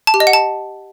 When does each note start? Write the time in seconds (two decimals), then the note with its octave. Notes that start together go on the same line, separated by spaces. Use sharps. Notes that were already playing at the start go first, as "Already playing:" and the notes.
0.07 A5
0.14 G4
0.20 D#5
0.27 F#5
0.33 A5